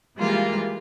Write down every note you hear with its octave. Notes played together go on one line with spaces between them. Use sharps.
E3 G3 G#3 A#3 F4